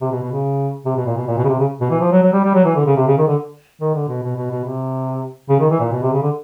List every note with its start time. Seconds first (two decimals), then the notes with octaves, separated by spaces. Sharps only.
0.01 C3
0.12 B2
0.23 B2
0.32 C#3
0.85 C3
0.96 B2
1.06 A#2
1.17 B2
1.27 A#2
1.38 B2
1.44 C#3
1.49 C3
1.59 C#3
1.81 B2
1.90 E3
2.01 F3
2.12 F#3
2.22 F#3
2.33 G3
2.44 G3
2.55 F#3
2.65 E3
2.76 D3
2.86 C#3
2.97 C3
3.07 C#3
3.18 D#3
3.28 D3
3.81 D#3
3.94 D3
4.09 B2
4.23 B2
4.37 B2
4.51 B2
4.65 C3
5.49 C#3
5.60 D#3
5.71 E3
5.80 A#2
5.92 B2
6.03 C3
6.13 C#3
6.22 D3